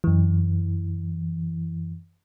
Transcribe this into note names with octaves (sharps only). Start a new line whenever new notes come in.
F#2 E3